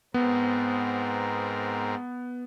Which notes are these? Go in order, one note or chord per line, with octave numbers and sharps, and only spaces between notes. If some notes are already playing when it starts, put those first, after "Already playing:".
G#2 B3 C4 A#4